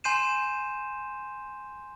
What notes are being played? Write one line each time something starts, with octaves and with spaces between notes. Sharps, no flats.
G#5 C6 G6 C7 D#7 E7